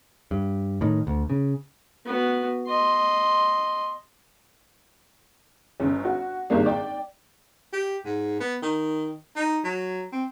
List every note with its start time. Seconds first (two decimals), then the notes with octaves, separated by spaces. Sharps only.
0.31 G2
0.81 A2 D#3
1.07 D2
1.30 C#3
2.06 B3 F#4
2.67 D#5 C6
5.80 G1 C#4
6.05 F#4
6.50 G#1 G3 G#3 A#3 D4
6.66 D5 G5
7.73 G4
8.05 G#2
8.40 B3
8.63 D#3
9.36 D#4
9.64 F#3
10.12 C4